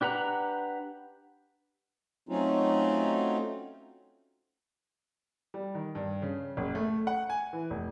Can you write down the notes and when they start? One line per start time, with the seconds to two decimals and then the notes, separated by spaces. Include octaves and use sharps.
0.01 D4 G4 B4 F#5 A#5
2.29 F#3 A3 C4 C#4 D#4 F4
5.54 G3
5.75 D#3
5.95 G2
6.22 C#3
6.57 F#1
6.75 A3
7.07 F#5
7.30 G#5
7.53 E3
7.70 F1